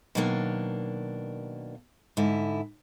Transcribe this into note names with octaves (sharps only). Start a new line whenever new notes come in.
B2 D#3 F#3 A#3 D4
G#2 D3 E4